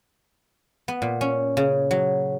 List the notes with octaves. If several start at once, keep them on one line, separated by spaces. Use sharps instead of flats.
B3
A#2
C#4
C#3
F#3